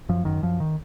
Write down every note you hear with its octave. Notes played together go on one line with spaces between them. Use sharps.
F#2 F3
F#2 D#3
F#2 F3
D#3